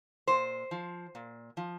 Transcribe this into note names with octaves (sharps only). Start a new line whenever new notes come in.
A#2 C5
F3
A#2
F3